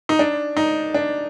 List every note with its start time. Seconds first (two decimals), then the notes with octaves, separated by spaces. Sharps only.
0.09 D#4
0.19 D4
0.57 D#4
0.94 D4